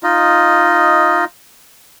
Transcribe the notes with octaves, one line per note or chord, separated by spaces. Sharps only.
D#4 F4 D#5